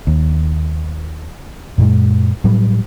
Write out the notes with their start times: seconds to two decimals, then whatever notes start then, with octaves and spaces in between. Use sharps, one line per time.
0.07 D#2
1.78 F#2 A#2 G#3
2.44 A2 F#3 G3